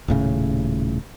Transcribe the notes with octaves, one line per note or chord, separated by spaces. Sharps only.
D#1 A2 C#3